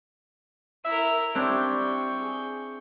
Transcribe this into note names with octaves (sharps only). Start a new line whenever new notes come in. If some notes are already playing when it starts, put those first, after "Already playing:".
E4 A#4 E5
G3 C4 D4 E4 G5 C#6
G#4